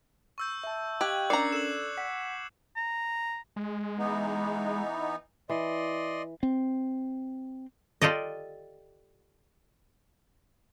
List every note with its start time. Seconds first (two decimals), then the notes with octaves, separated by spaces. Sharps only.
0.38 C#6 E6 G6
0.63 E5 A5
1.01 G4 D#5 F5 G5 F#6 G#6 F#7
1.30 C#4 D4 A#4 D5 A#5 D6 C7 C#7
1.52 A4 E6 E7 F#7
1.98 F#5 B6
2.77 A#5
3.56 G#3
3.98 E3 B3 D#4
5.49 E3 D5 D#5 C6
6.43 C4
8.02 F4 G4 A4 D5 D#5